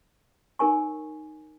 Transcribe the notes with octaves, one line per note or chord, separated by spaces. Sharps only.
D#4 A#4 C#5 G#5 C#6